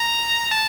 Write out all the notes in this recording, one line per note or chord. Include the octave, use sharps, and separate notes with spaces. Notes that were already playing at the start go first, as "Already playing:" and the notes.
Already playing: A#5
A5